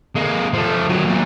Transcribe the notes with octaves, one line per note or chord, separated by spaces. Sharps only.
G#3 A#3
F3 A3
D#3 F#3
A#2 F#3